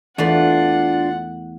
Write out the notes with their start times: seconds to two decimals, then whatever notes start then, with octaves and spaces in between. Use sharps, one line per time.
0.18 E2 A3 D4 F4 B4 F#5